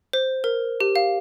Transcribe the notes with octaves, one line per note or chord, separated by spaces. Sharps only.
C5
A#4
G4
F5